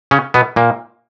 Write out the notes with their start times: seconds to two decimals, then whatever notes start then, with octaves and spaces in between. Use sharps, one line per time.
0.11 C#3 C#4
0.34 B2 B3
0.56 A#2 A#3